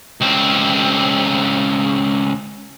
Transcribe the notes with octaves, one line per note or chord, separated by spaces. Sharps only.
C#2 C4